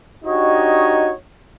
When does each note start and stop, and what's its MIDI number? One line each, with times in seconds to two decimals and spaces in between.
0.24 1.12 62
0.24 1.12 63
0.24 1.12 66
0.24 1.12 67
0.24 1.12 73
0.24 1.12 75